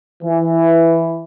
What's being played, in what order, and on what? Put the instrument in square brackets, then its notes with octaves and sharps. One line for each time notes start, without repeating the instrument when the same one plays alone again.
[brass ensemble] E3